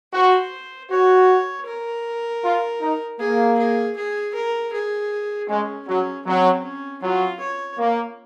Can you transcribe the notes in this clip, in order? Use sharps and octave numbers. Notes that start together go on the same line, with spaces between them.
F#4 C5
F#4 C#5
A#4
F4
D#4
A#3 G#4
G#4
G#4
A#4
G#4
G#3 C#4
F#3 C#4
F#3 C4
C#4
F#3 F4
C#5
A#3